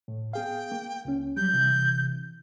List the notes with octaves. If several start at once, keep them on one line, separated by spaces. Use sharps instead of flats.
A2
B3 G#4 F5 G5
A#3
C#2 C#4
F#3 G3 G6
C3 E3